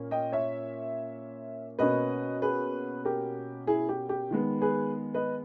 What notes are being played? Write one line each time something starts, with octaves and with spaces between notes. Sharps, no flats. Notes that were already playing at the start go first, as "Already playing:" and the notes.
Already playing: A#2 A#3 C#4
D#5 G5
C#5 E5
B2 A#3 C#4 B4 D#5
G#4 B4
G4 A#4
E4 G#4
G4
G4
D#3 G#3 B3
G#4 B4
B4 D#5